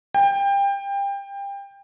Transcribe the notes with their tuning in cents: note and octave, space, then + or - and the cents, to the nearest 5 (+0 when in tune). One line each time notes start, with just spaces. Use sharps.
G5 +25